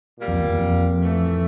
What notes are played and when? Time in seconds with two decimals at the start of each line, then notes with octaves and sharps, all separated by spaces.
0.18 A#2 G3 A#3
0.28 F2
0.38 E2
0.49 E2
0.59 F2
1.01 A2 E3 A3